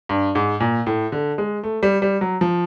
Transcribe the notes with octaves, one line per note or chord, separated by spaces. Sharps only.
G2
G#2
A#2
A2
D3
G#3
A3
G3
G3
F#3
F3